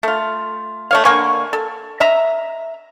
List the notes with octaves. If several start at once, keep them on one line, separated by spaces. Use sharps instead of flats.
A3 F4
A3 C#5 F5
D3 A#3 G#5 C#6
A4
D#5 E5 A#5